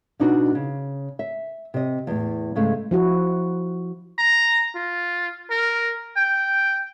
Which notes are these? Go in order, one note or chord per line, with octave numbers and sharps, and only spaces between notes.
B2 D4 D#4 F#4
C#3
E5
C3 D#5
E2 A2
G#2 C#3 G#3 A3
F3 E4 F#4
A#5
F4
A#4
G5